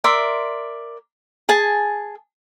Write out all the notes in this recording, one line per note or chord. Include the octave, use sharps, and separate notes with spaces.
A#4 D5 E5 C6
G#4 G#5 A5